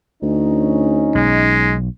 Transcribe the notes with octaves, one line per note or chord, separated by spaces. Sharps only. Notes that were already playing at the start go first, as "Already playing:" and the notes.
D2 C#4 D#4
B1 G#3